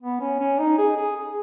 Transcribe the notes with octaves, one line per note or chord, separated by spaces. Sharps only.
B3
C#4
C#4
D#4
G#4
G#4
G#4